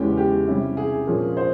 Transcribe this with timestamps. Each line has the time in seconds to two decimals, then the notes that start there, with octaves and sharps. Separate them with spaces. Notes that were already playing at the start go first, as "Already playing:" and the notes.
Already playing: E2 C#3 E3 G#3 C#4 G4
0.17 G4
0.47 C3 G3 C#4 E4
0.77 G#4
1.07 A#2 F3 A#3 C#4 F4
1.37 C5